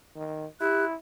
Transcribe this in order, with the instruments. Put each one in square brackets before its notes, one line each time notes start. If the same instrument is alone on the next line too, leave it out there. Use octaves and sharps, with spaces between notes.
[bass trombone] D#3
[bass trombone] E4 [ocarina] G4 [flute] F#6